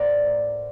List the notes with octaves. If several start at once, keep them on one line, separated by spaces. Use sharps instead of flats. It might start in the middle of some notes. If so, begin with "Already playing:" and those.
Already playing: A2 A#4 C5 D5 F#5
A2